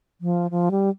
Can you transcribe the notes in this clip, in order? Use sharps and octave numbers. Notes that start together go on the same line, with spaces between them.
F3
F3
G3